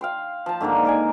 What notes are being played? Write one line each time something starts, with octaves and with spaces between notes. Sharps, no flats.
F5 G5 C6
F3 A5
G#2 D3 D#3 A#3
A#4 D5 G#5